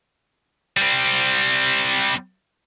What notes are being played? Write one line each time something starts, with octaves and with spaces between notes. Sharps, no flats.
G3 C4